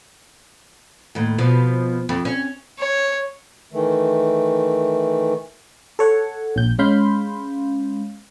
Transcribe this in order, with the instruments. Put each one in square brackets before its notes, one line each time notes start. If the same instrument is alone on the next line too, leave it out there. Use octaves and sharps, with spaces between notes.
[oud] D#2 A2
B2 F3
F2
C#4
[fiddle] C#5
[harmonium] D#3 E3 A3
[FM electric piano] A4 C#5 F#5 C#6
A#1 G6
G#3 C#4 F5 B5 C6 G6